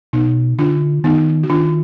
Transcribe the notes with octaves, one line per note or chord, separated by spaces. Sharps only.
B2 B3 D#4
D3 D4 F4
D#3 B3 D#4
F#4
D#3 D4 F4